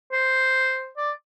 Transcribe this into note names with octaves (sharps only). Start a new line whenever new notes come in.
C5
D5